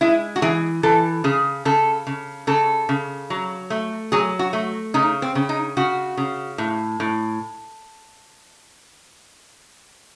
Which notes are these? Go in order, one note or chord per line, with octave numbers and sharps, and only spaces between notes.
G#3 E4
F#4
E3 G#4
E3 A4
C#3 G#4
C#3 A4
C#3
C#3 A4
C#3
F#3
A3
F#3 G#4
F#4
A3
C#3 D#4
C4
C#3
D#4
C#3 F#4
C#3
A2
A2